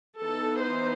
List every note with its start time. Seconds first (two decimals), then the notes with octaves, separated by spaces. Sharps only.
0.21 E3 B3 D#4 A4
0.63 C5